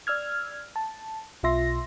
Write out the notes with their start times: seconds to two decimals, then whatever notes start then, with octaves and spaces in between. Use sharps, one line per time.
0.07 D5 E6 F6 G#6
0.76 A5
1.43 B1 B2 F4 E5 C6 A#6